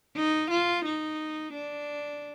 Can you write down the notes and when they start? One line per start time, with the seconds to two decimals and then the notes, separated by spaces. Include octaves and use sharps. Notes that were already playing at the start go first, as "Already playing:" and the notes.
0.17 D#4
0.51 F4
0.85 D#4
1.53 D4